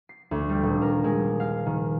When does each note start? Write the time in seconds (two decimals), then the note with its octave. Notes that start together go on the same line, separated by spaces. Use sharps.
0.09 C7
0.31 D2
0.49 G3
0.63 D#1
0.82 A#4
1.04 G#3
1.40 F5
1.66 D#3